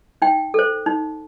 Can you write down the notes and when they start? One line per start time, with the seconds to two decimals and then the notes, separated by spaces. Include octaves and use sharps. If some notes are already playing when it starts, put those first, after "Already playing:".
0.22 D#4 G5
0.54 A4 C5
0.86 D#4